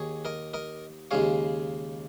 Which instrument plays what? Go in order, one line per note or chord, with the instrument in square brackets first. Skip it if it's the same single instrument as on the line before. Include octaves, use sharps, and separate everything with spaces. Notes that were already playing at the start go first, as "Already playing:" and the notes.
Already playing: [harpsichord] D#2 D#3 G#4 C#5
A#4 D#5
A#4 D#5
D#2 C#3 G#3 C#5 F5